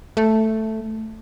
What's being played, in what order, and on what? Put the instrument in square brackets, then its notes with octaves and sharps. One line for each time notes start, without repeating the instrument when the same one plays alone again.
[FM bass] A3